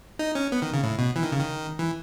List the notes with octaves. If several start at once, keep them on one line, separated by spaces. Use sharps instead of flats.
D#4
C#4
B3
D#3
C#3
A2
B2
E3
D#3
C#3
D#3
E3